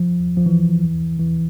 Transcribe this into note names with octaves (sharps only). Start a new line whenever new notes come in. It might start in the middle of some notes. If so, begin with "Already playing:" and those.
Already playing: F3
F3
E3
E3